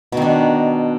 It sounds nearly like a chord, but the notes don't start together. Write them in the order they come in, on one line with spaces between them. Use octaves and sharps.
B2 D#3 D4